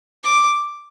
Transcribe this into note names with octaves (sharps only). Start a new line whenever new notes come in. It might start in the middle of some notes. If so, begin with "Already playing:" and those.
D6